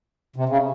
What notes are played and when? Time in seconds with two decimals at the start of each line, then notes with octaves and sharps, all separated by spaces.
0.36 C3
0.49 C#3